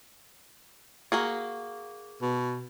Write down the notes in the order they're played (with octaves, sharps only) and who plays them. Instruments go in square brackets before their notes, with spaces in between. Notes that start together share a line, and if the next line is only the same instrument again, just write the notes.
[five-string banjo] A#3 F#4 G#4
[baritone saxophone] B2